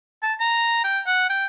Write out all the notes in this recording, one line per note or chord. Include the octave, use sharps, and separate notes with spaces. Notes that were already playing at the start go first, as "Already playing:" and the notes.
A5
A#5
G5
F#5
G5